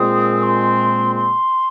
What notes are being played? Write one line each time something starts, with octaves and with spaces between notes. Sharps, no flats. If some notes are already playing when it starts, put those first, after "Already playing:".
Already playing: A#2 G#3 C4 D#6
C6
C6